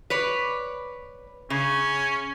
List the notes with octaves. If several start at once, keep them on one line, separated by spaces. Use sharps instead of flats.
B4 C#5 D5
C#3 C#4